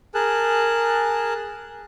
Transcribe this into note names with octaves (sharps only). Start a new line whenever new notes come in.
G#4 A#4 A5 F#6